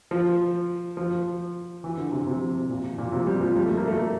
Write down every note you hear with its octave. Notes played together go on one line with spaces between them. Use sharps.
F3
F3
E3
D3
C3
C3
A#2
A#2
C3
G3
F3
G3
A3
A#3
A3